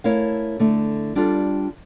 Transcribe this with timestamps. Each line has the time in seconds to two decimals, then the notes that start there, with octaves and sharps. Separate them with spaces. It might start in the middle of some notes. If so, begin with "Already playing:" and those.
0.04 A3 E4 A#4 C#5 F5
0.60 D3 A3 E4
1.15 G3 D4 F4 A4